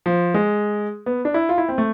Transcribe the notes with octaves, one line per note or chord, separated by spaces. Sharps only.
F3
G#3
B3
D4
E4
F4
E4
C4
A3